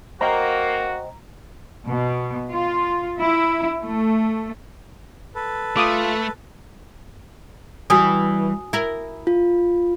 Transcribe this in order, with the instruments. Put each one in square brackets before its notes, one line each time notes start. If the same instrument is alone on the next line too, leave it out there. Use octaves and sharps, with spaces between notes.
[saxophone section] A#3 [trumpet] F#4 [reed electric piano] C5 D#5 G5 [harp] A#5
[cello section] B2
F4
E4
A3
[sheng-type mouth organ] A4 B4
[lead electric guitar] A3 [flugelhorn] F4 [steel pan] D6 D#6
[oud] E3 G3 [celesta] F#4 G#5 D#6
[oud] E4 A#4
[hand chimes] F4